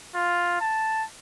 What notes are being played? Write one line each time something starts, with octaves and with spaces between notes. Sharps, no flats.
F4
A5